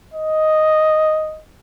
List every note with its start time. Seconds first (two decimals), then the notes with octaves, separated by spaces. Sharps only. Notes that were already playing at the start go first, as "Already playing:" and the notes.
0.14 D#5